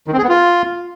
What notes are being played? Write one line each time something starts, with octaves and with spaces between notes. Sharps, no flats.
D#3
C4
G#4
B3
F4